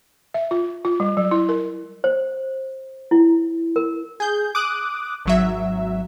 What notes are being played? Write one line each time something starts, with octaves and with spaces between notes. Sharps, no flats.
E5
F4
F4
G3
F#3
E4
A#4
C5
E4
A#4
G#4 G6
D6 D#6 F#6
G#1 F#3 E5